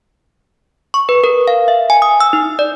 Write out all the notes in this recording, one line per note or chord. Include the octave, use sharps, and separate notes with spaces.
C#6
B4
A#4
F5
E5
G#5
D#6
E6
D#4
D5